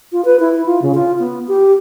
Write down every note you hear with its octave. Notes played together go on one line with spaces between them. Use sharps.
F4
B4
E4
F4
C#3
F4
B3
G4